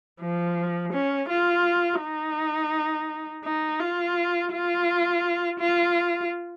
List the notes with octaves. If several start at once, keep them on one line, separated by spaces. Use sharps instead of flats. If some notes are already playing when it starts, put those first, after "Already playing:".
F3
C#4
F4
D#4
D#4
F4
F4
F4